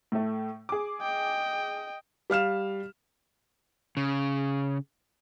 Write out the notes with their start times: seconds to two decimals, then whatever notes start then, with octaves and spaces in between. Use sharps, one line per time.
0.12 A2 A3
0.69 G#4 D6
1.02 D#5 G5
2.30 G3 F5 F6 E7
3.97 C#3